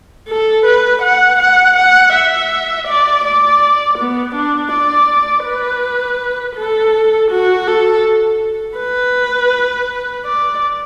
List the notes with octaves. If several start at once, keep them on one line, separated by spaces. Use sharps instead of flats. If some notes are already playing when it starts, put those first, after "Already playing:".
A4
B4
F#5
F#5
F#5
E5
D5
D5
B3
D4
D5
B4
A4
F#4
A4
B4
D5